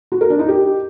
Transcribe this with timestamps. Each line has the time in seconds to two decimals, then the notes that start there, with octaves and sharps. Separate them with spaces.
0.12 F#4
0.21 A#4
0.30 D4
0.39 D#4
0.48 G4